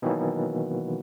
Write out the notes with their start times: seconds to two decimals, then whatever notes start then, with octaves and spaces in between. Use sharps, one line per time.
0.02 B2 D#3 E3 F#3 A#3